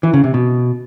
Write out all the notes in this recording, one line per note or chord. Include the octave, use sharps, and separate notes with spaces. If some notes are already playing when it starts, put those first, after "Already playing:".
E3
C#3
C3
B2